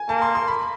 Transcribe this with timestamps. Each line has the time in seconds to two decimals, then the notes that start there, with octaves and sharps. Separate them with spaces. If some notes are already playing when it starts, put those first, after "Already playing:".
Already playing: G#5
0.09 A#3 A5
0.22 C6
0.35 C6
0.48 B5